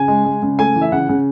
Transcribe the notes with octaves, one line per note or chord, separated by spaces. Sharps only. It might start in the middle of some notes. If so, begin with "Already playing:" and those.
Already playing: C#3 G#5
G#3
G#3
C#3
A3 G#5
E3
E5
C#3 F#5
C#3